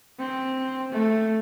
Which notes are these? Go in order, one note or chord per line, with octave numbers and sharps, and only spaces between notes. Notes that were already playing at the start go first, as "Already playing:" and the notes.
C4
A3